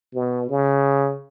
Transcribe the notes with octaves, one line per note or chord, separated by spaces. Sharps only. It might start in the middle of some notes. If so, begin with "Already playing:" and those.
B2
C#3